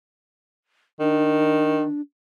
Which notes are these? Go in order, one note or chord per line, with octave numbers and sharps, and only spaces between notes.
D#3 D4